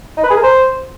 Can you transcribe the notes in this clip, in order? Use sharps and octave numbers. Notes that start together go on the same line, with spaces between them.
D#4
B4
G#4
A#4
C5